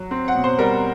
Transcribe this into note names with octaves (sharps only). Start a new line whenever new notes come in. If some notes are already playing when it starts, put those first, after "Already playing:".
Already playing: F#3
C4
F#5
B2
C5
G3 A#4